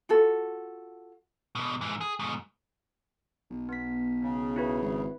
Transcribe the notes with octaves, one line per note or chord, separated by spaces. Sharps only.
F4 F#4 A4
E2 B2
G#2 E3
G#4
G#2 B2
B1
B3 B6
C#3
E4 F#4 B4
G#1